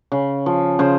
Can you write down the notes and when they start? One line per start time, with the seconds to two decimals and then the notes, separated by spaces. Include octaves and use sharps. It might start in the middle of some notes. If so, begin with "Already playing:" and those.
0.12 C#3
0.46 F3
0.79 C#3 C5